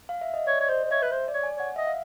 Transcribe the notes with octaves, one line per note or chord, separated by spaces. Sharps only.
F5
E5
D#5
C#5 D5
C#5
C5 D#5
C5
C#5 E5
B4
C5
D5
C#5
G#5
C#5 F#5
D#5 E5
F5